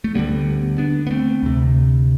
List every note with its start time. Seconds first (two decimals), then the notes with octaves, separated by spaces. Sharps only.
0.04 A3
0.14 D2 D3 G3 B3
0.78 B3 D4
1.07 B3
1.11 A3 C4
1.43 D2 C3